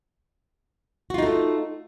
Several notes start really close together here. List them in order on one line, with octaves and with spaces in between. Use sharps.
F#4 F4 D#4 A3